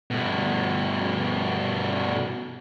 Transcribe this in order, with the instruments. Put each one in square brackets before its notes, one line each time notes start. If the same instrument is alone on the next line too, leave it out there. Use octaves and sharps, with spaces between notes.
[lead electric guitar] G2 B2